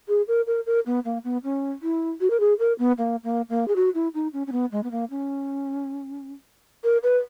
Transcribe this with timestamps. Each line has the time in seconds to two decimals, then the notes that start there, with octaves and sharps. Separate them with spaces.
0.08 G#4
0.28 A#4
0.47 A#4
0.66 A#4
0.86 B3
1.05 A#3
1.24 B3
1.44 C#4
1.83 E4
2.21 F#4
2.30 A#4
2.40 G#4
2.59 A#4
2.79 B3
2.98 A#3
3.24 A#3
3.49 A#3
3.68 G#4
3.76 F#4
3.95 E4
4.14 D#4
4.33 C#4
4.47 C#4
4.52 B3
4.72 G#3
4.83 B3
4.91 A#3
5.10 C#4
6.84 A#4
7.03 B4